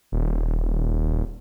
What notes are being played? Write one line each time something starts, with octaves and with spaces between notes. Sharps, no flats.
D#1